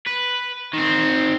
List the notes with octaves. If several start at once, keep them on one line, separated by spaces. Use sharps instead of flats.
B4
D#3 C4